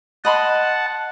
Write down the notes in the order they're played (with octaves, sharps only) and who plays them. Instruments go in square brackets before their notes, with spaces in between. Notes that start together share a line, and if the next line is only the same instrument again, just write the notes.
[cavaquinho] D#5 B5 C6 [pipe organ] F#5 A5